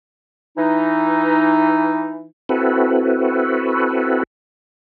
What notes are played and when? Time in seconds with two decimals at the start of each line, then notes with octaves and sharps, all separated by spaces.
0.58 E3 D#4
2.49 C4 E4 F#4 A4 B4